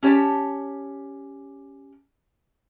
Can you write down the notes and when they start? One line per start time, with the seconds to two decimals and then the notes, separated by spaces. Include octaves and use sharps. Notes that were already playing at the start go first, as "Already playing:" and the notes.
0.03 C#4 G4 C#5 D5 A5